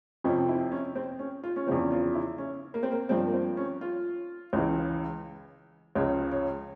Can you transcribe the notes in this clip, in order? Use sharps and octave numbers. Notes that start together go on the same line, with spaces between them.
F2 C3 F3 C#4
E4
C#4
C4
C#4
F4
C#4
E2 C#3 F3 C4
F4
E4
C#4
A#3
C4
A#3
G2 F3 C4
A#3
C4
C#4
F4
C#2 C#3 E3
C#2 C#3 F3 C#5
C#5